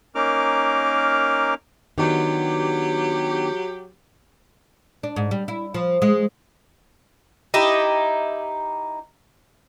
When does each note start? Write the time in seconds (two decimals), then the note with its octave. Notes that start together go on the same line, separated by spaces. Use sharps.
0.15 A#3 C#4 D#4 A#4 D6 F6
1.98 D#3 F#3 B3 D4 G4
5.03 D4
5.16 G#2
5.31 G3
5.48 E4
5.74 F3
6.02 G#3
7.54 D#4 E4 G4